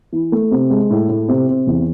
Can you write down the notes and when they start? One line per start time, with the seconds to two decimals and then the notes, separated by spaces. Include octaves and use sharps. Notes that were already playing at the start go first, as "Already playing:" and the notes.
0.13 E3
0.32 A3
0.51 C3
0.70 G#3
0.90 A2
1.09 A2
1.29 C3
1.48 C3
1.67 E2